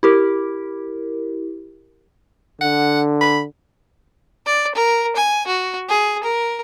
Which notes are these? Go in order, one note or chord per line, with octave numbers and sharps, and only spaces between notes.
E4 G4 A#4
D3 F#5
B5
D5
A#4
G#5
F#4
G#4
A#4